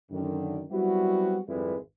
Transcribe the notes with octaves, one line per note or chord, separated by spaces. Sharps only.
F#2 D3 D#3
F#3 G3 B3 C4 E4 F#4
G#1 F2 G3 G#3 E4 B4